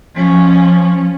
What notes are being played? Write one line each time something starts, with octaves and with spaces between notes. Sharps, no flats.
F3 C#4